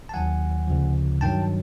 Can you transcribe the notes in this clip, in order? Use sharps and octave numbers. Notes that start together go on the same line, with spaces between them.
A5
D#2 D#3 F#3 F#5 G#5
D2 C#3 F3
G2 D#3 F#3 G5 A5